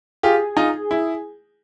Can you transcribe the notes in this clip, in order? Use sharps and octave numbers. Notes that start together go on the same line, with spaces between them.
F4 G4 G#4
D#4 F4
E4